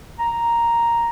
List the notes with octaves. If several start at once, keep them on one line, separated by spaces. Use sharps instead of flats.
A#5